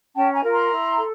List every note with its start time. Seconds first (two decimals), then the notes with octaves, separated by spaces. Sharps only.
0.14 C#4 G5 A5
0.33 G#5 A#5
0.43 F4 A#4
0.51 A#5 C6
0.70 E4
0.97 A4